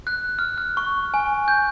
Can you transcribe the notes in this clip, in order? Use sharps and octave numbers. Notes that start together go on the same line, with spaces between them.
F#6
F6
F6
C#6
G#5
G6